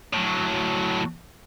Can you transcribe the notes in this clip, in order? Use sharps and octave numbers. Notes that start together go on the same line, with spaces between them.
A2 F#3